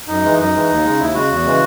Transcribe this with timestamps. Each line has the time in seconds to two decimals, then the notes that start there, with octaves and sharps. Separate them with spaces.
0.08 F#2 D#4
0.23 E3 G#3
0.39 F#2 D#4
0.55 E3 G#3
0.70 D#2
0.85 C#3 G#3
0.99 D#2 E4
1.14 C#3 G#3 F#4
1.31 E2
1.45 C#3 E3 G#3